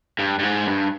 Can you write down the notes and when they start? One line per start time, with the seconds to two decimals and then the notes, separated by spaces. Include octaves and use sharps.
0.19 G2
0.39 G2
0.43 G#2
0.67 G2